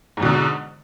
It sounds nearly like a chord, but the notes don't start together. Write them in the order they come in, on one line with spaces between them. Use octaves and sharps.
G#2 E2 B2 D3